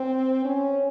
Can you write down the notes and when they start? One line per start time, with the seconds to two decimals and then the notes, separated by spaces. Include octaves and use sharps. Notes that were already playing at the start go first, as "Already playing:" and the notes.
Already playing: C4
0.45 C#4